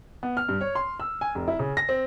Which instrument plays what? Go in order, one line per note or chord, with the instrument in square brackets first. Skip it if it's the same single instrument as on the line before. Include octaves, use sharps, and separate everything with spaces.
[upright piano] B3
F6
G2
C#5
C6
E6
G#5
F1
E4
C#3
A#6
C4